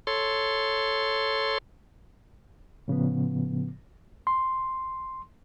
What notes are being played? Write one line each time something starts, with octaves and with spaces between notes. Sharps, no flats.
A4 C#5 C6
A2 C#3 F3 B3
C6